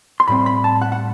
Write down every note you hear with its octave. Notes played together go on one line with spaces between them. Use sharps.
C6
A2 G3 C4 B5
B5
A5
F#5
F#5